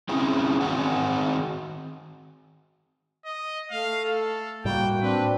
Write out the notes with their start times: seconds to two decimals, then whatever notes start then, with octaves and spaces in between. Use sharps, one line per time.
0.09 C4 C#4 E4 G#4
0.61 D#3 C4 F#4 G#4 F#5
3.25 D#5
3.71 A3 F5
4.05 A4
4.65 A2 G3 A#3 F#4 G5
5.01 C4 D4 B4